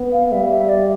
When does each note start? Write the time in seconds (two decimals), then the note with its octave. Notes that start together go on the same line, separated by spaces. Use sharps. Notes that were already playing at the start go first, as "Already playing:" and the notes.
Already playing: B3
0.13 F5
0.32 G3 E5
0.51 E5
0.69 D5